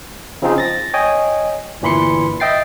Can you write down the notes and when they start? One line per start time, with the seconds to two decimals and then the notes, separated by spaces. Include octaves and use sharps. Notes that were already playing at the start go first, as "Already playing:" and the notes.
0.42 C#3 F3 C4 D#4 F4 G#4
0.58 A6 A#6
0.94 C#5 D#5 G5 G#5
1.82 G1 A#2 E3 B5 C6 C#7
2.40 D#5 E5 G5 A6 C7